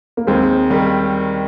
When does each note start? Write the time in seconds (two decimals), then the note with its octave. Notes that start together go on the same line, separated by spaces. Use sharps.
0.17 A#3
0.27 D#2 G#3 C4
0.70 D#3 G3 A#3